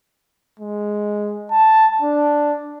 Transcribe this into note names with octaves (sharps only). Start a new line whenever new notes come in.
G#3
A5
D4